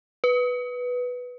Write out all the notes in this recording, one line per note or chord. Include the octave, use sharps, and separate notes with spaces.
B4